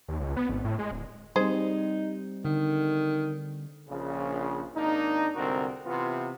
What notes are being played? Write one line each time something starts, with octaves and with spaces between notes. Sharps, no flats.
D#2
C#2
B3
G#1
A2
G#3
D1
G3 C4 D#4 G#4 C5
D3 D#3
A#1 C#3
G#1 A#3 D4 D#4
C2 G#2 D3 C4 F#4 A#4
C3 E3 B3 F4